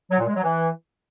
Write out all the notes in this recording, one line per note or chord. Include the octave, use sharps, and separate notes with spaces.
F#3
A#2
G#3
F#3
E3